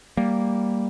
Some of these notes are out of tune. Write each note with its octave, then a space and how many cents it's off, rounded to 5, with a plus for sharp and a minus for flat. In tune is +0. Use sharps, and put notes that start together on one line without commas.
G3 +0 A#3 +0